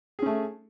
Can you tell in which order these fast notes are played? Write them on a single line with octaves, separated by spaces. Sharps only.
G#4 C#4 A3